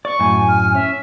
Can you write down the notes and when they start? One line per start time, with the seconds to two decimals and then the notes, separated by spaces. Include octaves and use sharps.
0.05 D5 C#6
0.20 F#2 A2 G#5
0.48 F6
0.75 C#4 E5